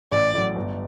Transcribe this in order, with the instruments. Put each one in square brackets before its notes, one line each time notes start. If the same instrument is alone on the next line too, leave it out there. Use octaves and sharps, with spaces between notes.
[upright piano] A1 [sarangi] D5
[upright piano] A2 F#3
G1